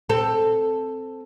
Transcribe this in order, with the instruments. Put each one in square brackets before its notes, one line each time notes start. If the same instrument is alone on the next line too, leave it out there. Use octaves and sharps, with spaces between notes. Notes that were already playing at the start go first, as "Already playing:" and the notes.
[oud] C4 A4